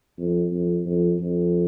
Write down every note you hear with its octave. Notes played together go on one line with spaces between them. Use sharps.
F2
F2
F2
F2